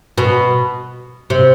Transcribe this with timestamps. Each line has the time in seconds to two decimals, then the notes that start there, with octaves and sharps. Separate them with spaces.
0.18 B2
1.30 C3